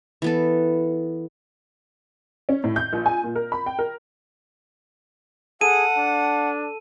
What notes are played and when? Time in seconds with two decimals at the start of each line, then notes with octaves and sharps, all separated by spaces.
0.22 E3 B3 A4
2.49 C#4
2.64 A2
2.76 G6
2.93 A#1
3.06 G#5
3.23 A#2
3.36 A#4
3.52 B5
3.66 G5
3.79 A#4
5.61 G#4 A4 F#5 D#7
5.97 D4